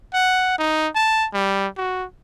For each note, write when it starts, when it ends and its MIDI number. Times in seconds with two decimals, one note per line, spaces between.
0.14 0.55 78
0.58 0.88 63
0.95 1.27 81
1.33 1.68 55
1.78 2.05 66